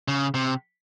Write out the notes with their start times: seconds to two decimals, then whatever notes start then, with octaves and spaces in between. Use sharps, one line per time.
0.08 C#3
0.34 C3